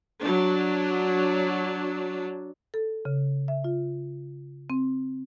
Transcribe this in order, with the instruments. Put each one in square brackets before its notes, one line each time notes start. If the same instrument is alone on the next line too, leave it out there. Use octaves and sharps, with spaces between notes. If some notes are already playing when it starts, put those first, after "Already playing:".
[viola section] F#3 D4
[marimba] A4
C#3
E5
F4
C4